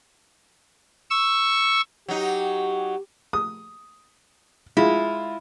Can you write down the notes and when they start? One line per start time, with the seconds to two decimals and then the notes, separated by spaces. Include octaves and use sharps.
1.10 C#6 E6
2.09 F#3 D#4 G4
3.33 D#6
4.77 G#3 E4 F4